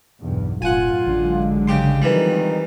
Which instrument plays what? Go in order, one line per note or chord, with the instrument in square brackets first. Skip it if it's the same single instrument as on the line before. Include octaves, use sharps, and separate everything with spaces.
[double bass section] B1 E2 G2
[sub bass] E1 [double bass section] F#2 A2 [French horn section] F4 [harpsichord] F#5 G#5
[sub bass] A1 [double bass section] D3 F#3 G#3
[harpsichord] C#3 G4 C6
[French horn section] F2 D#3 [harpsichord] E3 G3